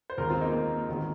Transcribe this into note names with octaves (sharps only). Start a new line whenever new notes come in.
C5
D#2 D#3 G#3 F4 A#4
C4 F4
A#3 D#4
A#3
G#1 D#3 G#3